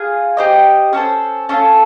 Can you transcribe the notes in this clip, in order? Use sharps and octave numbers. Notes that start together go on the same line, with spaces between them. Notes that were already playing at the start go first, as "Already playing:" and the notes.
Already playing: F4 G#4
G4 C5 D#5
C#4 F#4 A4 C5
A3 C#4 F4 A4